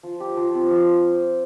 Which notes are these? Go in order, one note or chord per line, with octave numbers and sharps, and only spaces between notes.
F3
G4
F3
C4
F3